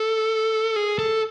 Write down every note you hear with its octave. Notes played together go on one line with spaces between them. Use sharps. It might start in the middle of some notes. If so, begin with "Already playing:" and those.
Already playing: A4
G#4
A4